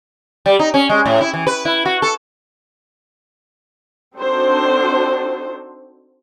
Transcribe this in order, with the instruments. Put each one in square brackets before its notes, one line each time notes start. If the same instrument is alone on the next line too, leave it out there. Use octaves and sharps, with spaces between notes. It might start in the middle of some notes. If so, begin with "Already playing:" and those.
[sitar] G3
D#4
C#4
G#3
A2
E4
E3
B4
E4
F#4
A4
[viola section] C4 D4 D#4 F#4 A4 C5